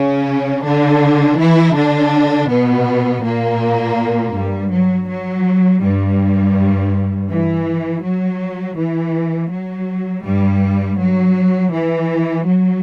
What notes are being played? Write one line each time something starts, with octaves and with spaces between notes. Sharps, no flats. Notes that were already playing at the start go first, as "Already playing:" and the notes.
Already playing: C#3 C#4
D3 D4
E3 E4
D3 D4
B2 B3
A#2 A#3
G2 G3
F#3
F#3
G2 G3
E3
F#3
E3
F#3
G2 G3
F#3
E3
F#3